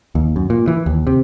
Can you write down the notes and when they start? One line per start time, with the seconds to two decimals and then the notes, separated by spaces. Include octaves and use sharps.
0.15 D#2
0.36 F#2
0.50 A#2
0.68 E3
0.86 D#2
1.07 C3